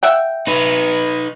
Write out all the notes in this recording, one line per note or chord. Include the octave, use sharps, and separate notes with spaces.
E5 F#5 G5
D#4 B4